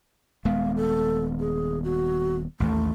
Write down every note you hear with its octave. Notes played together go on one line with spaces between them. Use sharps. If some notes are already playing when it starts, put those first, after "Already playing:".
D#1 G#3 B3 F5
A4
G#4
F#4
A1 D#2 A3